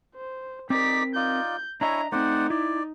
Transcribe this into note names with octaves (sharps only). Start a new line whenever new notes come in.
C5
C4 D#4 A#4 D5 D6 B6
D#4 F4 D5 G6
D4 E4 C#5 D#5 E5 G#5 A#5
A3 C4 D#4 C5 D5 F#5
E4 D5